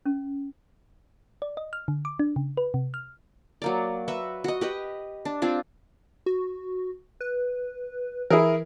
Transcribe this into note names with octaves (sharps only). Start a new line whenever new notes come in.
C#4
D5
D#5
F6
D3
D6
D4
C#3
B4
C3
F6
F#3 A#3 D5
F#4 B4 E5
F#4 D#5
G4 B4 D#5
D4
C4 D4 F4
F#4
B4
E3 E4 G#4 A#4